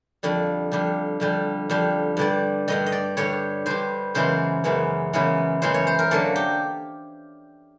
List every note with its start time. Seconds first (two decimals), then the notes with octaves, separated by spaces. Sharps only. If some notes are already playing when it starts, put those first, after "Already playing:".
0.23 F2 D3 G3
0.72 F2 D3 G3
1.20 F2 D3 G3
1.70 F2 D3 G3
2.17 G2 D3 G3 D5
2.68 G2 D3 G3 D#5
2.86 D#5
2.92 D5
3.17 G2 D3 G3 C#5
3.66 G2 D3 G3 C5
4.15 F#2 C#3 E3 G#3 B3 C5
4.64 F#2 C#3 E3 G#3 B3
5.13 F#2 C#3 E3 G#3 B3
5.62 F#2 C#3 E3 G#3 B3 C5
5.74 C#5
5.87 C5
5.99 A#4
6.11 D3 F#3 A#3 A4
6.36 G4